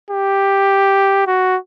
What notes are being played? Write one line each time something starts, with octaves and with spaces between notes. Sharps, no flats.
G4
F#4